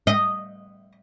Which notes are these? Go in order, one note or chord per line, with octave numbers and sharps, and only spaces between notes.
D#5